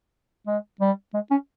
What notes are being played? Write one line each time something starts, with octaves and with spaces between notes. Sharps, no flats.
G#3
G3
G#3
C#4